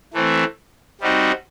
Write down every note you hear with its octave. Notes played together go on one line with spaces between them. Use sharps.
E3 A3 C4
G3 C4 D#4 F#4